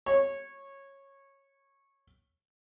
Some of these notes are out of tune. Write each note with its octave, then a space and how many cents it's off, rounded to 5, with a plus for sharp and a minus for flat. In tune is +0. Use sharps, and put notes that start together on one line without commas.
C#5 -15